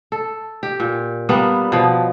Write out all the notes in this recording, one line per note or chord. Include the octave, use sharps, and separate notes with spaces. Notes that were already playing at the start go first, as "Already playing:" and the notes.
A4
G4
A#2
G3 A#3 B3 D4
B2 F3